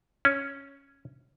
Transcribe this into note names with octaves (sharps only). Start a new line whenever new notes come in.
C#4